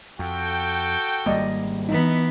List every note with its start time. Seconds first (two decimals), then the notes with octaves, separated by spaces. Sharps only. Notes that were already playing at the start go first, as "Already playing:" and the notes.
0.19 F2 F#4 A4 G5
1.26 G#1 G3 A#3 D5 D#5 D#6
1.89 E3 B3 D#4